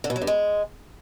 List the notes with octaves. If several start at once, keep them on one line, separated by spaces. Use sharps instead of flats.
D3
B2
F#3
G2
G#3